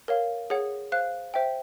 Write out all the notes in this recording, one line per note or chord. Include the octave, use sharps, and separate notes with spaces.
A#4 C#5 F5
G#4 C#5 F#5
C5 F5 F#6
C5 E5 G5